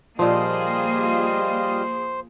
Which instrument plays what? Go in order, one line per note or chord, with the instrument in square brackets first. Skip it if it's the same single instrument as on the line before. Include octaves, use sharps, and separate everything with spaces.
[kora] A#2 F3 [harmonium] G3 F4 D#5 [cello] A#3 G#4 [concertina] C5